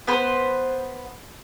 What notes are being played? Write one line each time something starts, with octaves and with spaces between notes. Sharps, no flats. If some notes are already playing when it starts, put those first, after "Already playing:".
B3 B4 C5